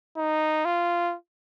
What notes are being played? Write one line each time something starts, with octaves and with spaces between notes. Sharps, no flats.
D#4
F4